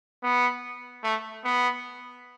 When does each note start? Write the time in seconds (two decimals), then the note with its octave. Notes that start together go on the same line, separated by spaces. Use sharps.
0.23 B3
1.03 A3
1.44 B3